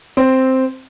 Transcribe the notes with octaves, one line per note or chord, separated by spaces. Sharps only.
C4